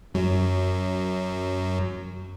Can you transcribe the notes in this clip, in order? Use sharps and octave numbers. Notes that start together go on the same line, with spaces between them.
F#2 F#3